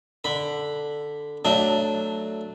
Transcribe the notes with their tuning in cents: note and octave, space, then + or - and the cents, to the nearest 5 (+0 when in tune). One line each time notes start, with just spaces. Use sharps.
D3 +0 B5 +0
F#3 +0 A3 +0 D4 +5